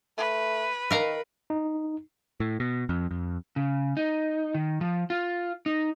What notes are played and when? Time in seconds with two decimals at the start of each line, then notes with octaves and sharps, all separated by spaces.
0.18 A3 B4
0.91 D#3 A#4 F5 A#5
1.50 D#4
2.40 A2
2.60 B2
2.89 F2
3.11 F2
3.56 C#3
3.97 D#4
4.55 D#3
4.81 F3
5.10 F4
5.66 D#4